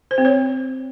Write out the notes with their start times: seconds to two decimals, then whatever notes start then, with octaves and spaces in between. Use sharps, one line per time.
0.11 C5
0.18 C4
0.25 C#5